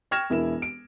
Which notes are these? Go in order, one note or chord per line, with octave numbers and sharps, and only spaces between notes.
G5 C#6 F6 G#6 A#6 E7
E1 E4 A#4 E7
D7